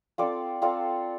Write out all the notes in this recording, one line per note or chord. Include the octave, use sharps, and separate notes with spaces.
C4 F4 A4 D5
C4 F4 A4 D5